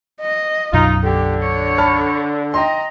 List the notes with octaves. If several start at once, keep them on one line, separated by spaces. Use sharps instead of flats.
D#5
B1 F#2 B2 D#4 F4
D3 G4
C#5
A5 B5 F6
D#5 G5 A#5 C6